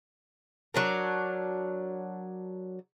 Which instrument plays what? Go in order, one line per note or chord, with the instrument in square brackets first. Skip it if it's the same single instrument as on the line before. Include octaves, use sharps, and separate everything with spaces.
[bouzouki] F#3 D4 A#4